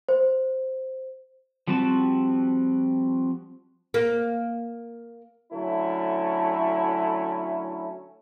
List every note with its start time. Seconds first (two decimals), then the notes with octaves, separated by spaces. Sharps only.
0.09 C5
1.67 F3 G3 C4 F#4 A5
3.94 A#3
5.53 D3 F#3 A3 C#4 E4